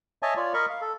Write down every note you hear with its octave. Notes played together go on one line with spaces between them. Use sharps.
C#5 D#5 E5 G#5 A5
F4 C#5 D5
A#4 D#5 B5 C#6
F5
A4